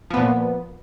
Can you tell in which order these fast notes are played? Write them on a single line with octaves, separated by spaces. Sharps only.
F3 B3 A#2